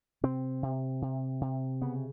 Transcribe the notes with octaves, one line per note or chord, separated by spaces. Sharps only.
C3 C4
C3
C3
C3
C#3 B3